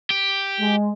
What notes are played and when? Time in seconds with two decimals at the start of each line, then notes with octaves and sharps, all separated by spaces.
0.10 G4
0.60 G#3